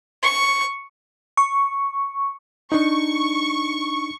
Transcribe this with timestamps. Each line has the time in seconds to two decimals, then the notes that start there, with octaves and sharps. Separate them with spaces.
0.23 C#6
1.37 C#6
2.72 D4 D#4 C#6